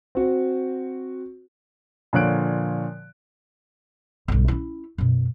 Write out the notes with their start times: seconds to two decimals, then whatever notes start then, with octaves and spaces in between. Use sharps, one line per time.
0.15 C4 F#4
2.13 A#2 D3 F3 C#5 F#6 D7
4.28 B1 G2
4.48 C#4 E4
4.98 F#2 B2